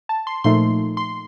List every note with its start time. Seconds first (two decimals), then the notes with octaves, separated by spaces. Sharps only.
0.09 A5
0.27 C6
0.44 A#2 F3 A3 D#4 C6
0.97 C6